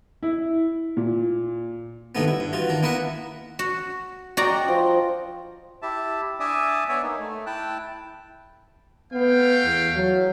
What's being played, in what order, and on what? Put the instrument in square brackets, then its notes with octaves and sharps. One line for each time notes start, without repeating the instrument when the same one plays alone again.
[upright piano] E4
A#2
[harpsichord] G2 A#2 D#3 A3 B3
E4
G2
E3 F4 F#4
D#3 D4
A#3 B3 E4 A#4 B4 F#5
[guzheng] F#4
[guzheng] F#4 D5 A#5 [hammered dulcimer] D#5 G5
[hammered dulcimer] F3
[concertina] E4 G4 E5 A5
D4 D5 E5 G#5 A5 D#6
B3 C#5 D5 E5 G#5
A#3 D#4
A3
E4 G5 A5 F#6
[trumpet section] A3 F5 G5 [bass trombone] B3
[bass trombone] E2
F#3